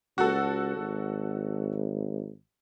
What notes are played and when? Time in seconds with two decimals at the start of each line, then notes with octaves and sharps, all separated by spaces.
0.18 C#2 F#4 A4
0.77 G#1